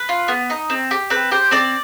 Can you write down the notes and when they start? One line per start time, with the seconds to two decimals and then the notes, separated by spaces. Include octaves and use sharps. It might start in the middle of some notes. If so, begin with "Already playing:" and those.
Already playing: B4
0.09 F4
0.28 B3
0.50 D#4
0.70 C4
0.91 G4
1.10 C4 B4
1.31 G4 C5
1.51 C4 D5